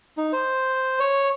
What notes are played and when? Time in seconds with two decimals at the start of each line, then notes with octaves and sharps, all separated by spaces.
0.17 D#4
0.33 C5
1.00 C#5